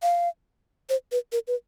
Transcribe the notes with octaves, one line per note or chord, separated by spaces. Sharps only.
F5
C5
B4
A#4
B4